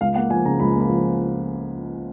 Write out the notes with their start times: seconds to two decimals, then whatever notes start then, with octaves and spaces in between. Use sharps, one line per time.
0.01 C#2 F5
0.15 A#3 F#5
0.30 F3 G#5
0.45 C#3 A#5
0.60 C#2 B5
0.75 A#3
0.80 B5
0.90 F3